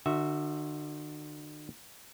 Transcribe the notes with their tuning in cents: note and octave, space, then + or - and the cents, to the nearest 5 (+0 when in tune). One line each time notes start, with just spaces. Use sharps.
D3 +40 F#4 +0 E5 +0